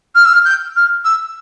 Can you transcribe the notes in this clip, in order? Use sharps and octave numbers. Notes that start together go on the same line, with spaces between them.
F6
E6
F6
G6
F6
E6